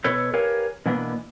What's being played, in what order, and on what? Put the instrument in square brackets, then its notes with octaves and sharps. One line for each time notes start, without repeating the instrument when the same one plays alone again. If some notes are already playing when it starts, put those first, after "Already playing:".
[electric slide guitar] B2 A4 B4 C#5
G4 A#4 B4 C#5 F5 G#5
B2 E3 A#3 B3 D4